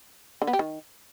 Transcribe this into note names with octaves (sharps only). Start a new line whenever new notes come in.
D3
B3
G4
D#3